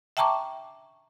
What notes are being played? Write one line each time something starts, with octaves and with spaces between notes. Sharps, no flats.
E5 G5 A5 A#5 C#6 D6